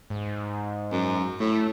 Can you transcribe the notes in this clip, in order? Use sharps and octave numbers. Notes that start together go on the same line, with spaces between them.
G#2
F#2
A2 A3